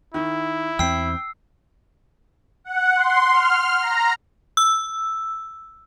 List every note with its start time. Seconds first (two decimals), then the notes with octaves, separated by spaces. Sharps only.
0.14 D#3 E4
0.79 E2 A3 C4 G5 E6 C7
2.64 F#5
2.96 C6
3.32 F6
3.80 A#5
4.57 E6